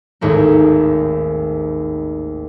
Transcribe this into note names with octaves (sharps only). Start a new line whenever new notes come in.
G#1 D#2 A2 A#3